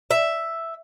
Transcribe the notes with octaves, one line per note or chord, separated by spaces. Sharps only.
E5